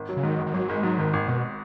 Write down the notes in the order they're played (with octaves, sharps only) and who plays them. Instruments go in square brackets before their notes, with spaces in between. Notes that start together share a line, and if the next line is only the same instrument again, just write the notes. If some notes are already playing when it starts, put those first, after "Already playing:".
Already playing: [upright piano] G#1
F#3
[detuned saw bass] C#3
[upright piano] G#2 [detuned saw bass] D#3
[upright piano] G#1
[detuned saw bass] D#3
[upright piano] G#1 [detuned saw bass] F#3
[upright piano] G#1 [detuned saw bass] G#3
[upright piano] G#2 [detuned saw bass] F#3
[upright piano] G#1 [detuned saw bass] D#3
[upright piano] G#1
[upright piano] G#1 [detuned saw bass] B2